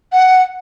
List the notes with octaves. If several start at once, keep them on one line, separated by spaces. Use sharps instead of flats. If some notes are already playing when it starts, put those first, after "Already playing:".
F#5